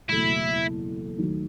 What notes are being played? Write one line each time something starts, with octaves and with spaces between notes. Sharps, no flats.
F#1 E2 B2 A3 E4
D#2 D#3 F#3 A3